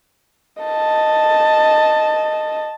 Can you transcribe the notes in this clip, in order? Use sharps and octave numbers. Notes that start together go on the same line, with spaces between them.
D#5 A5